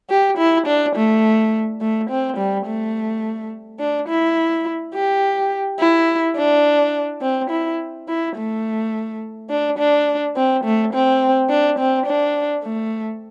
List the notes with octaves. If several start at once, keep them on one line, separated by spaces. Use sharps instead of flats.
G4
E4
D4
A3
A3
C4
G3
A3
D4
E4
G4
E4
D4
C4
E4
E4
A3
D4
D4
C4
A3
C4
D4
C4
D4
A3